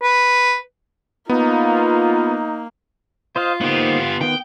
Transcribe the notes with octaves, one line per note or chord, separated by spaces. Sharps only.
B4
A#3 B3 D#4 F4
F4 C5 D#5 F5
A#3 B3 D#4 G4 C5
D#3 B3 G5